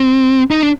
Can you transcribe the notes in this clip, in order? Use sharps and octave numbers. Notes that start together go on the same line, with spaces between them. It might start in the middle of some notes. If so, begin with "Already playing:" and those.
Already playing: C4
D#4
D4